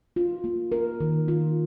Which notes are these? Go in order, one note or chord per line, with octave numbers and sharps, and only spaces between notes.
F4
A#3
A#4
D#3
F4